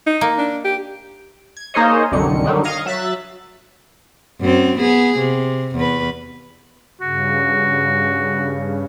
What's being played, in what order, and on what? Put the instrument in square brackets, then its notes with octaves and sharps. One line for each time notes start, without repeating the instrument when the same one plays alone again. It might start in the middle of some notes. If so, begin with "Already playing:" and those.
[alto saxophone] D#4
[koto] A#3
[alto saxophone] D4
G4
[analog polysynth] G#6
A#3 D#4 G#4 C5 C#5 D#5
C2 F#2 D3 D#3 C#7
D3 D#3 F#3 G3
D#5 F5 G#6 A#6 C#7
F#3 E5 F#6 A6 B6
[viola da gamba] F#2 C4
B3 G#4
C3
E2 B4
[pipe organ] G2 C#3 [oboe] F#4